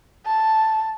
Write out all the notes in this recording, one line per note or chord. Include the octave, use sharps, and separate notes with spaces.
A5